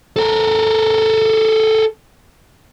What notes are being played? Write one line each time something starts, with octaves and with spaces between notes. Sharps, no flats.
A4 A#4